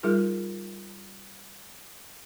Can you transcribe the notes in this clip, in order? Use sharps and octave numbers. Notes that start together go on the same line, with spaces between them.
G3 D#4 F4 G#4 A#4